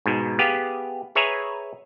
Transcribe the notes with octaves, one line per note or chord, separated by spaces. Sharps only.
G#2 B2
B3 G4 G#4 F5
G#4 B4 C#5 E5 G#5 A#5